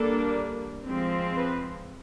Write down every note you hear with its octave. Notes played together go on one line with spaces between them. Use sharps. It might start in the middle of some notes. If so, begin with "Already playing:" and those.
Already playing: G3 A#3 D4 A4
F3 G#3 C4
B4